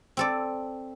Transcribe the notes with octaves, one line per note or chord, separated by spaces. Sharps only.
C4 A4 D5